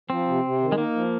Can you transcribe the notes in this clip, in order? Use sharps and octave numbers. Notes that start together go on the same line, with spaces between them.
F3 C4
C3
C3
D#3
G#3
A#3 D#4
F3